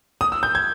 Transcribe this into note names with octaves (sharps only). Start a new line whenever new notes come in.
D#6
E6
G6
G#6